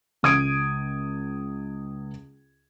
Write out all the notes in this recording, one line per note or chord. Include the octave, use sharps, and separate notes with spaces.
C#2 D#6 G#6 D7